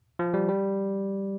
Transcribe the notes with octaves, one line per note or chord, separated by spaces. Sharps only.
F3
G3
G3